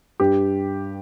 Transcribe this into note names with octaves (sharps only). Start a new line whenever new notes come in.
G2 G4